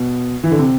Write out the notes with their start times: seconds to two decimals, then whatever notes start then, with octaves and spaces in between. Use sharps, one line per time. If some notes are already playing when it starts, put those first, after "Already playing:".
Already playing: B2
0.44 E3
0.51 D3
0.59 C3